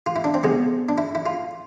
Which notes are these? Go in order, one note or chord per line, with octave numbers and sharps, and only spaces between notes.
F4
E4
D4
C4
C2 B2 G#3 B3
D4
E4
E4
F4